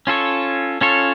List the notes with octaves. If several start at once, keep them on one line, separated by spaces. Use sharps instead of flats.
C#4 F4 A4 C#5
C#4 F4 A4 C#5